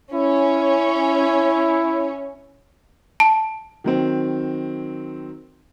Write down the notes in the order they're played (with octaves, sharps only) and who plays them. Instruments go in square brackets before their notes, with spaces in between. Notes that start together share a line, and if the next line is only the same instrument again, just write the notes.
[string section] C#4 [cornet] E4
[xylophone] A5
[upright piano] D#3 F#3 C4